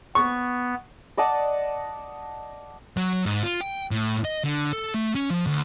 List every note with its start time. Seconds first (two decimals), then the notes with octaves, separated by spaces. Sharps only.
0.15 B3 C#6
1.17 D5 D#5 F#5 A5
2.97 F#3
3.26 G#2
3.43 F4
3.61 G5
3.91 A2
4.25 D#5
4.45 D3
4.73 A4
4.94 A3
5.15 C#4
5.30 F3
5.47 D2